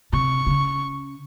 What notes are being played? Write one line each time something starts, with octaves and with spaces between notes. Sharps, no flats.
C3 C#6
C#3